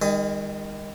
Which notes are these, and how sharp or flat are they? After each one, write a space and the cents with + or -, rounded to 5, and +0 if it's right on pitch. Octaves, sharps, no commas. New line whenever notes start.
D#3 +0 G#3 -45 D#6 +10